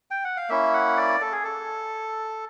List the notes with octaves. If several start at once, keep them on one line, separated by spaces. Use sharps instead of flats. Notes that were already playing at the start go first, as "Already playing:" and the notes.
G5
F#5
F5
A#3 C#4 E4 E5
F#5
D5
A4
G#4
A4